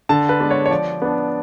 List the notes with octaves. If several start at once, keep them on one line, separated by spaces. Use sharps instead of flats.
D3 A5
B4
G#3 B3 D4
C#5
C#5
F3 D5
B3 D4